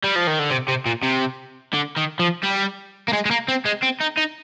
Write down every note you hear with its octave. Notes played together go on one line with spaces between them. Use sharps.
G3
F3
D#3
D3
C3
C3
A#2
C3
D3
D#3
F3
G3
A#3
G#3
G#3
A#3
C4
G#3
C4
D#4
D#4